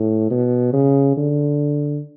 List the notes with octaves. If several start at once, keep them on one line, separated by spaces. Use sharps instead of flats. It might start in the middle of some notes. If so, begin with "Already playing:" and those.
Already playing: A2
B2
C#3
D3